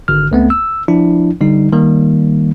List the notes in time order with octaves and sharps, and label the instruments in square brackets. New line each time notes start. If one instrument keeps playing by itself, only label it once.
[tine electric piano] G#1 D3 F6
C#2 A3 B3 C4
E6
F3 D4 E4
D3 G3 D#4
D#3 G3 A#3